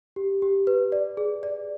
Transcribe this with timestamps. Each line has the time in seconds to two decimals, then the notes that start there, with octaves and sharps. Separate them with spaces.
0.16 G4
0.42 G4
0.67 B4
0.92 D5
1.17 G#4
1.43 D5